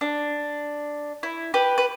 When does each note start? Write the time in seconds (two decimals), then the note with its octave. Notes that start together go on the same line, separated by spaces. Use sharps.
0.01 D4
1.23 E4
1.54 G4 B4
1.78 B4